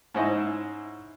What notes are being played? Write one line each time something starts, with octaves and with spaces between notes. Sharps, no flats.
G#2 C#4 E4 C5 D#5